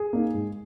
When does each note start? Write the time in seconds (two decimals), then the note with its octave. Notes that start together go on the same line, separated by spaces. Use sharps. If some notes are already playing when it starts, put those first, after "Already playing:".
Already playing: G#4
0.13 A#3 D#4
0.34 G#2